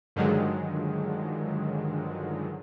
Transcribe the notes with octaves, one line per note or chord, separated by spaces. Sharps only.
G2 D3 D#3 F3 F#3 G#3